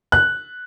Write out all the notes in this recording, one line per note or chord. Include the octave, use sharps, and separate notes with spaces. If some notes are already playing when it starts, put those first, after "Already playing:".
F#6